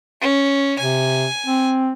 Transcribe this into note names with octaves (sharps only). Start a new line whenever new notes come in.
C#4
C3 G#5
C4